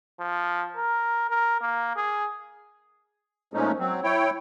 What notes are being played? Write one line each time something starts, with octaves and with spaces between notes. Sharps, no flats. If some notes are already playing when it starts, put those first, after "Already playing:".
F3
A#4
A#4
A#3
G#4
A#2 F3 G#3 A3 C#4 D#4
F#3 C4
E4 C#5 G5